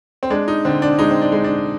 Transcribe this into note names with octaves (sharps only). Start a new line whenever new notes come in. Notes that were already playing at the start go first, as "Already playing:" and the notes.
C4
G#3 D4
D#4
D3 C4
D4
G#3 D#4
C4
D4
G#3
D4